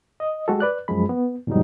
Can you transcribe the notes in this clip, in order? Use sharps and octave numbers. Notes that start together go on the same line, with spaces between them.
D#5
G#3 F#4 G4 A4
B4 D5 F#6
F#2 F3 G#3 B5
B3
E2 G#2 C3 F#3 G3 D#4